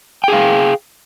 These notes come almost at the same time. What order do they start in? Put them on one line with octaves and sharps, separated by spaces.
G5 G#4 F5